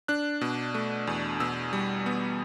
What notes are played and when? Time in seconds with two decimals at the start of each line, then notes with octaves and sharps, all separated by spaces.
0.08 D4 F#6
0.41 B2
0.74 A3
1.07 E2
1.40 B2 E6
1.73 G3
2.06 B3